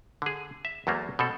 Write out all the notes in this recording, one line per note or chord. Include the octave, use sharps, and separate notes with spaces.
D3 G#4
E5
E2 F#3 A3 A#3
B2 C4 A4